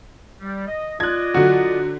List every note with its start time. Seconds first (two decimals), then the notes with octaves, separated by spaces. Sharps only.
0.42 G3
0.68 D#5
1.00 F4 D5 D#5 F#6 G#6
1.34 D3 F#3 F#4